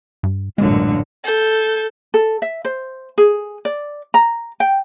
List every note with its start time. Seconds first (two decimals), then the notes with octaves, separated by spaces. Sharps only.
0.23 G2
0.58 A1 F#2 A#2 D3 F#3 G#3
1.24 A4 G6
2.14 A4
2.42 E5
2.65 C5
3.18 G#4
3.65 D5
4.14 A#5
4.60 G5